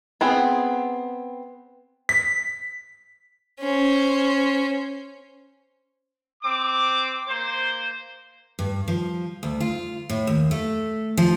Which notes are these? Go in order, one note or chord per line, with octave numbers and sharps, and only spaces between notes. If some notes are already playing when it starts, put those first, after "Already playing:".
B3 C4 G#4
B6
C#4 C5
C4 D6
A#3 C5
G2
F3
D2
F4
A2
D#2
A3
F3